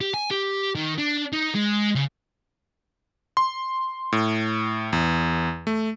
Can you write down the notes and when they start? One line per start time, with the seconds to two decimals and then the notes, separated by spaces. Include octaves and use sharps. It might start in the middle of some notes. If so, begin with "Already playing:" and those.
0.01 G4
0.14 G#5
0.31 G4
0.75 D#3
0.98 D4
1.33 D#4
1.55 G#3
1.95 C#3
3.37 C6
4.12 A2
4.93 E2
5.67 A3